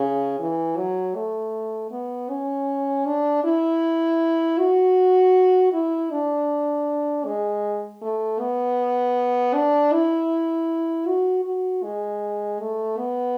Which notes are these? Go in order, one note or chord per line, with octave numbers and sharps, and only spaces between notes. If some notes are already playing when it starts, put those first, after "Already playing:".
Already playing: C#3
E3
F#3
A3
B3
C#4
D4
E4
F#4
E4
D4
G#3
A3
B3
D4
E4
F#4
F#4
G#3
A3
B3